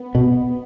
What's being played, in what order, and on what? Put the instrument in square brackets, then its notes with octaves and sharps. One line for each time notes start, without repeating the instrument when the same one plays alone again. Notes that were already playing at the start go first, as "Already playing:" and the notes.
Already playing: [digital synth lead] B3
[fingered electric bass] B2